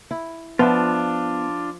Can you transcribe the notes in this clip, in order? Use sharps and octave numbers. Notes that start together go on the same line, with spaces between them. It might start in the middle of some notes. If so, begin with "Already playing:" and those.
E4
F3 B3 D4 F4 E5